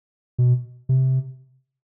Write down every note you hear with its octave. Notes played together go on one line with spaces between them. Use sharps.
B2
C3